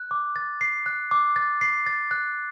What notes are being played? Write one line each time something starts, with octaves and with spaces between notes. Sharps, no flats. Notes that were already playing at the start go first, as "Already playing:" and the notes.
Already playing: F#6
D6
A6
C7
F#6
D6
A6
C7
A6
F#6